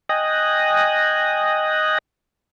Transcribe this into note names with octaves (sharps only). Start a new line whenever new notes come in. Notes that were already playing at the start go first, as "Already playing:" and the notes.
D#5 G5 G#5 D#6 F#6 A#6